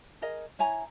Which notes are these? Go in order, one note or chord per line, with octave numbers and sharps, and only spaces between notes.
G#4 A#4 D#5
E4 C#5 G#5 A#5